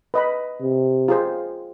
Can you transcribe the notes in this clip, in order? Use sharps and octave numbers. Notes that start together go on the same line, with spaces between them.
B4 D#5 B5
C3
F4 G#4 C5